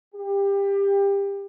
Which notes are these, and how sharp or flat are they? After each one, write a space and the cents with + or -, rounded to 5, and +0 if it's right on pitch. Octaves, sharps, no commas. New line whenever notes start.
G4 +25